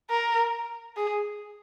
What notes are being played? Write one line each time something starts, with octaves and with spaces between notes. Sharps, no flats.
A#4
G#4